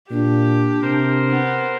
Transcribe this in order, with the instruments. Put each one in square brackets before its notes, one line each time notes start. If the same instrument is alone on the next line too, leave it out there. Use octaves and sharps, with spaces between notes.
[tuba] A#2 [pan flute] D4 [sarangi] G4
[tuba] C3 [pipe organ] A#4 C5
[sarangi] B3